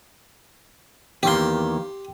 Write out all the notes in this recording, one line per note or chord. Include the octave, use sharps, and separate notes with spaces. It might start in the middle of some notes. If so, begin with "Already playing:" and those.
E2 D#3 A#3 G4 C6